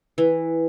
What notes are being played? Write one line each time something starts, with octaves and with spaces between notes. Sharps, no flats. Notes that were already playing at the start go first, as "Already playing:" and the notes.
E3